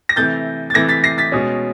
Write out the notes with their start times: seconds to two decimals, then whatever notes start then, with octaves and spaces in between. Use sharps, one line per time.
0.09 A#6
0.16 C3 E3 A3 G6 A6
0.70 A6
0.74 C3 E3 A3 G#6 A#6
0.89 A6 B6
1.04 A#6 C7
1.18 A6 B6
1.32 B2 G#3 C#4